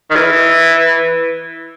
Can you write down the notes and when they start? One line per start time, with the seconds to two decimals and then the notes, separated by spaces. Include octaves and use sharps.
0.10 D#3
0.15 E3